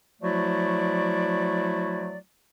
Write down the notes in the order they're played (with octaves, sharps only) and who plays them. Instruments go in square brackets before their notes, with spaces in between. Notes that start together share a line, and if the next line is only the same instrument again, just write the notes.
[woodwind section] F3 F#3 A3 E4 F#4 D5